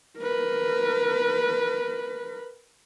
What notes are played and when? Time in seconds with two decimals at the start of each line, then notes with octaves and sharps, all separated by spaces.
0.18 A#4 B4